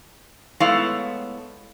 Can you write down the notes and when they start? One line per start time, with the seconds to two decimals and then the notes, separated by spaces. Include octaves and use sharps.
0.60 G#3 A3 B3 E4 C#5 F5